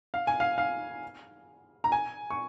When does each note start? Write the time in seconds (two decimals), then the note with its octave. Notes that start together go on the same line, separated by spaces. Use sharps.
0.14 F5
0.27 G#5
0.40 F5
0.58 F5
1.84 A#5
1.92 G#5
2.30 C#6